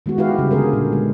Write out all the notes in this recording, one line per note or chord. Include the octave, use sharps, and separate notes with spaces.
D#3 G#3 B3 F#4
E4 F#4 G4 B4 F5
C#3 G3
D3 B3 G#4 A#4 C5
A#2
G#3